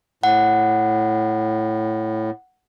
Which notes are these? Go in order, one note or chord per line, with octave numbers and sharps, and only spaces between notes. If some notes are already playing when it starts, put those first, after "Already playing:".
A2 F#5